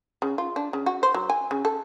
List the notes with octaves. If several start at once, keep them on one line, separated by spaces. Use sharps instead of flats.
C#3
F4
D4
C#3
F#4
C5
F#3
G#5
C#3
A4